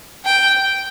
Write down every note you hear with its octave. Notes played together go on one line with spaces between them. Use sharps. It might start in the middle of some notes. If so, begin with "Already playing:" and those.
G5